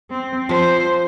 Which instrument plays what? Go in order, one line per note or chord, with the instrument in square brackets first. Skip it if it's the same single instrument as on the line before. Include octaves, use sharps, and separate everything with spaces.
[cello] C4
[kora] F3 [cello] C5